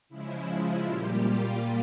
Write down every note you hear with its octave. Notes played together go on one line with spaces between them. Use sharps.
C#3 F3 G#3 E4
F4
A#2 G3 A#3 G4
F4